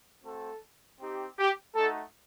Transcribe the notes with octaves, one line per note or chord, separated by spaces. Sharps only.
A3 C4 F#4 A4
C4 D#4 G4
G4
A3 D#4 F#4 A4